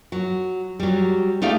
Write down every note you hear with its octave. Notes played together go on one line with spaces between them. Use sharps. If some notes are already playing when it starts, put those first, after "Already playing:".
F#3
F#3 G3
A3 D#4 G4 D5 F5